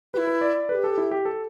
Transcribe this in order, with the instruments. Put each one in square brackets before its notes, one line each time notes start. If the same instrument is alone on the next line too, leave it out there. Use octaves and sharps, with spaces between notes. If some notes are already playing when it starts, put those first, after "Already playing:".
[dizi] E4 G4 [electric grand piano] B4
[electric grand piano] B4
D5
[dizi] A4 [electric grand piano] B4
[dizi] G4
[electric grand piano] A4
E4
G4
A4